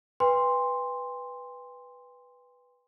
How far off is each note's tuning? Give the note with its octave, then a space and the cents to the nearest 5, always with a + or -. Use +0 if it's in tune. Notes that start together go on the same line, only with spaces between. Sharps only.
B4 +0 G5 +45 C6 +0